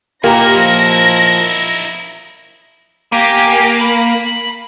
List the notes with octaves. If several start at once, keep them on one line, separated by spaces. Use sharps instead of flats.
A#2 A#3 D#4 E4 G4 A#6
F3
A#3 G4 G5 G#5
B5